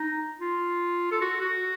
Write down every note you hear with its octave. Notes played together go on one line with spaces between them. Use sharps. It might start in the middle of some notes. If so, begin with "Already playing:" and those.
Already playing: D#4
F4
A4
F#4
F#4